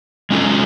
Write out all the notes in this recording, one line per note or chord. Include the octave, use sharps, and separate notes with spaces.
G#3 C#4 F4 A4